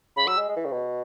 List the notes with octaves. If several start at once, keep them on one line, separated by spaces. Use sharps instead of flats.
C#3 B5
F#3 E6
G#3
G#3
E3
C#3
B2